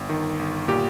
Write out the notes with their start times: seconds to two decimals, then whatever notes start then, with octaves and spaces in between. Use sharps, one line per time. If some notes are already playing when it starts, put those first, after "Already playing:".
Already playing: G1
0.09 D#3
0.39 G1
0.68 A#2 G4